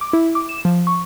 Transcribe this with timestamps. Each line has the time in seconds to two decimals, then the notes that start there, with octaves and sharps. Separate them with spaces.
0.01 D6
0.13 E4
0.35 D6
0.49 E7
0.65 F3
0.87 C#6